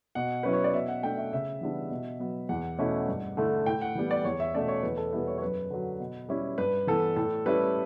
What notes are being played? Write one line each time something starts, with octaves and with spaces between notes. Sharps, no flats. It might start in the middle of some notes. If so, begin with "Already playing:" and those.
B2 F#5
F#3 C#4 E4 B4
C#5
D5
B2 E5
F#5
A3 D4 G5
E5
C#3 E5
E3 G3 B3 D4
B2
F#3 B3
E2 F#5
B2 A3 C#4 E4
G2
D3 A3 E4
A2 G5
F#5
E3 G3 B3
D5
E2 C#5
E5
B2 A3 C#4 D5
C#5
E2 B4
A4
B2 G3 B3 E4 B4
C#5
C#5
F#2 B4
D3 F#3
B2
G3 C#4 E4
G2 B4
E3 B3 A4
A2 A4
G3 C#4 E4 B4